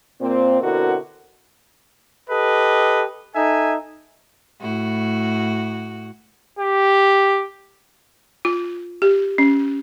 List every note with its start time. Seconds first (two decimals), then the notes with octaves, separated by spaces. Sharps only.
0.20 A#2 C4
0.61 B2 D3 C4 E4 F#4 A#4
2.29 G4 A4 B4 D#5
3.35 D#4 A4 E5 G#5
4.60 A2 F#4
6.59 G4
8.45 F4
9.02 G4
9.38 C#4